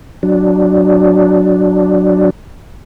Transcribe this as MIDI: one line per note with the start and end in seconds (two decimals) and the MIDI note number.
0.23 2.30 54
0.23 2.30 62